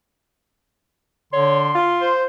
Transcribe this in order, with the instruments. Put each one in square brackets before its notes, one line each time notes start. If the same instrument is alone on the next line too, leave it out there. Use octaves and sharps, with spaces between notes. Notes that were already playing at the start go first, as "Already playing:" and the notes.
[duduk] D3 [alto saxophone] C#5 [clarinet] C6
[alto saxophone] F4
[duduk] C5